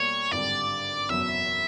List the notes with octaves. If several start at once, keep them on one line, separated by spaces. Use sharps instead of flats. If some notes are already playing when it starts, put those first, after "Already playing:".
Already playing: B2 G3 A#3 C#5
G#1 G2 D3 G3 D5
F#1 E2 B2 F#3 E5